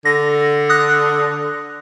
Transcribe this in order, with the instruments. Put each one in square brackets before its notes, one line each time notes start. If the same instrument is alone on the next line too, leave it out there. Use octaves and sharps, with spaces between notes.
[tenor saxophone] D3 [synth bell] A#6
[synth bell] D#6 F#6 A#6